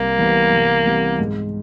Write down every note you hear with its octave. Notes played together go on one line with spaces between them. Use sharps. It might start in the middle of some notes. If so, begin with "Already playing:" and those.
Already playing: C2 A#3
C3 E3 G3 B3
C2
C3 E3 G3 B3
G#2